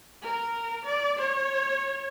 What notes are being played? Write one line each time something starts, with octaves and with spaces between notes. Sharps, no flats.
A#4
D5
C#5